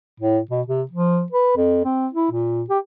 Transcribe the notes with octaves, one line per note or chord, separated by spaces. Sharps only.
A2
B2
C3
F3
B4
F2
C4
E4
A#2
G4